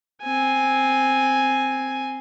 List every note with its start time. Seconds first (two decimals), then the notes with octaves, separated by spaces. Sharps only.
0.22 C4 G#5